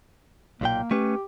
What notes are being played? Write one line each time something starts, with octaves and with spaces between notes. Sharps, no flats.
B1 A#2 A#3 G5
A3 C#4 G4 B4